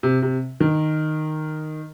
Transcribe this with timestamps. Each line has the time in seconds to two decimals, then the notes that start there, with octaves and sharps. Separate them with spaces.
0.03 C3
0.22 C3
0.60 D#3